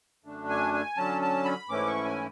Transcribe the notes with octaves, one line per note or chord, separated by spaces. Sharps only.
F#2 D3 A3 D4
G#5
G#5
D3 F#3 C#4 A5
A5
B5
G#2 E3 A3 C#4 E4 D6
C#6
G#5